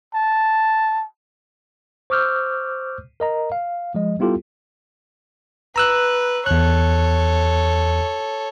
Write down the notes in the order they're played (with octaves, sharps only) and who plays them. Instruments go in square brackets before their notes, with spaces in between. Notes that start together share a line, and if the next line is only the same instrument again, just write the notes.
[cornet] A5
[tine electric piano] C5 C#6 D6 E6 F6 G6
A#4 D#5 A#5
F5
F3 G#3 D#5
G3 B3 E4 F4 G4 A4
[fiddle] B4 [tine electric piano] A#5 E6 F#6
[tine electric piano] E2 F#6 [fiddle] A4 C#5